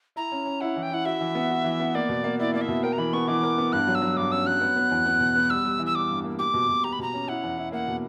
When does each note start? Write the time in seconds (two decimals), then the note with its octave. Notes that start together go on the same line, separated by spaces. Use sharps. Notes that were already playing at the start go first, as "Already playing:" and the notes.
0.16 E4 A#5
0.32 C#4
0.46 C#4
0.61 E4 F#5
0.76 E3
0.83 G5
0.91 E4 F#5
1.05 F#4 E5
1.20 E3
1.35 B3
1.50 F#4
1.64 E3
1.80 B3
1.95 A#3 D5
2.09 B2
2.24 A#3
2.39 E4 D5
2.54 A#3 D5
2.61 E5
2.68 B2
2.83 A#4 G5
2.93 A#5
2.98 E3 B5
3.13 B3 C#6
3.28 E3 D6
3.43 A#4
3.58 B3
3.73 G2 F#6
3.87 F#3
3.95 E6
4.02 F#3
4.17 G2 D6
4.32 C#4 E6
4.46 F#3 F#6
4.61 B3
4.76 B3
4.91 E2
5.06 B3
5.20 B2
5.36 B3
5.50 G3 E6
5.64 G3
5.79 E3
5.86 E6
5.95 G3 D6
6.10 G2
6.24 A#3
6.39 G4 D6
6.54 B2
6.69 B2
6.84 G4 A#5
6.93 B5
6.99 B2 A#5
7.14 C#4
7.28 E4 F#5
7.43 E2
7.57 E4
7.72 A#3 F#5
7.88 B2